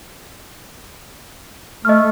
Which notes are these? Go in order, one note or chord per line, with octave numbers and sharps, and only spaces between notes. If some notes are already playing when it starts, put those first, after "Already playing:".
A3 D#5 F6